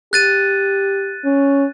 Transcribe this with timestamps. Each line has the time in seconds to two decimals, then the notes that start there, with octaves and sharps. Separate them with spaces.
0.13 G4 F#6 A6 D#7
1.24 C#4